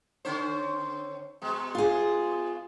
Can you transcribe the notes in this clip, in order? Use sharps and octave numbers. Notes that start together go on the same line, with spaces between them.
D3 C#4 C5
B2 G#3
F4 G#4